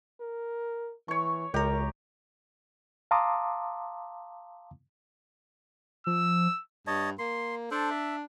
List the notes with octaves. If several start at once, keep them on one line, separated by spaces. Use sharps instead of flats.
A#4
E3 C#5 C#6
C#2 G4 A#4 A#5
F5 A5 A#5 C6 D6 D#6
F3 E6
G2 C#5 D#5 A5
A#3 C6
D4 A4 C5
E5